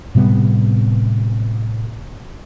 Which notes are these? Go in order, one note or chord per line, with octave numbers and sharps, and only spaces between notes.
A2 C3 G3 B3